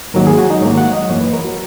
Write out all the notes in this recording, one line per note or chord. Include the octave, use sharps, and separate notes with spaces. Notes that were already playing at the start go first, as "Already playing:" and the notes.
G#2 D#3 F#3 A#3 A#4
G#4
F#4
D#4
G#2 D#3 F#3 A#3 C#5
F#5
D#5
F#2 E3 A#3 C#5
B4
A#4
F#4